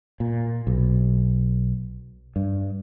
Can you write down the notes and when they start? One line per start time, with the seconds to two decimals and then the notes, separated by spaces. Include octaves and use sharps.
0.20 A#2
0.67 B1
2.36 G2